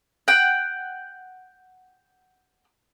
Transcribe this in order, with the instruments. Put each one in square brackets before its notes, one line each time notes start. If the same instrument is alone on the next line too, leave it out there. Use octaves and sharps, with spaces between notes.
[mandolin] F#5 G5